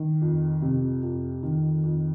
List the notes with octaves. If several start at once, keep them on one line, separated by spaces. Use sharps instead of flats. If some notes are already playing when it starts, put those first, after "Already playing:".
Already playing: D#3
F2
C3
F2
D#3
F2